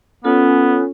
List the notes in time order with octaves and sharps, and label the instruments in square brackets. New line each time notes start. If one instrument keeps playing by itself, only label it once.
[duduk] B3 [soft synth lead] C#4 [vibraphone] F4 A4